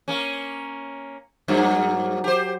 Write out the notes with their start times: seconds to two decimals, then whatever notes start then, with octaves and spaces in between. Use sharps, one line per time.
0.08 A#3 C#4
1.48 G2 F#3 A#3
2.24 G4 C5